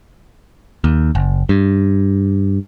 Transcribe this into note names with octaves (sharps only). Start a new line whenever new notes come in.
D#2
F#1
G2